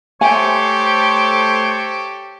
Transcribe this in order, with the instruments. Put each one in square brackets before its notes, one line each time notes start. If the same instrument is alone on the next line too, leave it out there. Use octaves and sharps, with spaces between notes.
[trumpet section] A3 C5 [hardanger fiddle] G4 A4 [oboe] C#5 [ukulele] E5 G#5